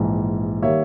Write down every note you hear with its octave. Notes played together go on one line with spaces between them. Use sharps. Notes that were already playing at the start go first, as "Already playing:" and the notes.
Already playing: A#1 G#2 E3
D#3 G3 A#3 C#5 E5